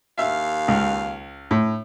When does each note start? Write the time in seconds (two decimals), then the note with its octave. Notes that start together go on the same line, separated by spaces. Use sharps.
0.19 D#2 E5 F5
0.68 C#2
1.51 A2